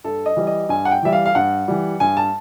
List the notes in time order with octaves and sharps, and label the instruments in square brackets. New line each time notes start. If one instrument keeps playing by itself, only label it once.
[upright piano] G2 A4
D#5
E3 G3
D#5
G2 G#5
F#5
G5
E3 G3 E5
F5
F5
G2 F#5
E3 G3
G2 G#5
A5